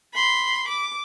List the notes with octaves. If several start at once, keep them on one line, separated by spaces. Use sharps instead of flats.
B5 C6
D6